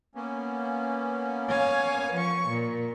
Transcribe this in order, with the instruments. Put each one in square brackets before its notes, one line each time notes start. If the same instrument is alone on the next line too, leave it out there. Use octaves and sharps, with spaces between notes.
[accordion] A#3 B3 C#4
[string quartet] C#5 F5 G#5
F3 C#6
A#2